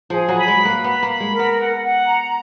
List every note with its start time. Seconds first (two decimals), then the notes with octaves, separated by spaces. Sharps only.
0.10 F3 G#4
0.29 F#3
0.35 B5
0.48 G#3
0.60 B4
0.65 A#3
0.84 B3 B5
1.03 A#3
1.08 B5
1.20 G#3
1.32 A#4
1.39 B3
1.57 F#5
1.81 F#5
2.05 A#5